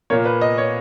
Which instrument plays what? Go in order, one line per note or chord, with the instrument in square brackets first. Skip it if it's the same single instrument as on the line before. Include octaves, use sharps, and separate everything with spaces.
[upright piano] A#2 A#3 C#5
B4
D#5
C#5